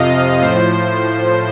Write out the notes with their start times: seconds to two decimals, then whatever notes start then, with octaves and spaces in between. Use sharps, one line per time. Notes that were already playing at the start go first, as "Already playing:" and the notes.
Already playing: F2 C3 F3 D#5 F5
0.42 A2 F3 C5